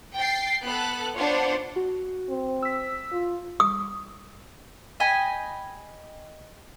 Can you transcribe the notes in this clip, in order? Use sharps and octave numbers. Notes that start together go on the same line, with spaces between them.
G5 A6 C7
B3 A4 F#6
B3 D4 F4 C5 C#5 F#5
F#4
C4
E6 B6
F4
D#6
D#5 G5 G#5 B5